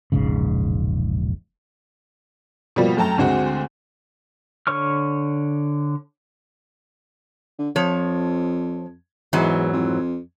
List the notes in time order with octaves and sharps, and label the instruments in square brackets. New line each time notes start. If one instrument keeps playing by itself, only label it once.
[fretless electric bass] E1 A#1 G#2 C#3
[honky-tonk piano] B2 F3 G3 A#3
F#2 A3 G5 A5 A#5
D2 D3 G#3 C4 F#4
[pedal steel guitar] D3 C#5 C#6 F6
[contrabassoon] D3
[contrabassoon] F2 [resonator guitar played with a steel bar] F3 C#5
[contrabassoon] E2 [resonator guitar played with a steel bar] G#2 E3 F#3
[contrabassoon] F2